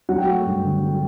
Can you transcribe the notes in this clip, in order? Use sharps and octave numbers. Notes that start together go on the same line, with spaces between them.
F#3 F#5
G5
A3 F#4 F#5
G2
D3
F#3